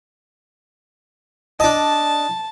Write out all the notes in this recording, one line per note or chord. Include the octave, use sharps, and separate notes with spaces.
D4 D#5 A5